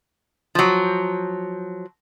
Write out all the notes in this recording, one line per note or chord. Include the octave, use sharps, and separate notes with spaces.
F3 F#3